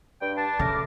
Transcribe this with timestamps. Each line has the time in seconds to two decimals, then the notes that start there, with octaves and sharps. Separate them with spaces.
0.22 G2 G5
0.37 D4 A5
0.59 C#3 A3 A#4 D6